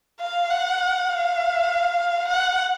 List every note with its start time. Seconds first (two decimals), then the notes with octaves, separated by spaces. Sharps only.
0.20 F5
0.50 F#5
1.09 F5
2.28 F#5